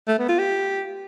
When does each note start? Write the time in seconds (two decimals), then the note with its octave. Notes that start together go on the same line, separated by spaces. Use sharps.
0.08 A3
0.18 B3
0.29 F4
0.39 G4